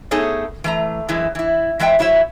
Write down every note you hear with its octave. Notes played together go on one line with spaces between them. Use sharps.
A3 B3 D#4 G#4 A4 C#5
E3 A3 A#5
F#2 E3 G#3 E4
E3 E4
E3 G#3 E5 F5 G5
F#3 E4 C5 C#5 E5